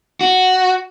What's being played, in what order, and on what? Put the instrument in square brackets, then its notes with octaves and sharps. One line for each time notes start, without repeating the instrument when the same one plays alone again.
[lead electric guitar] F#4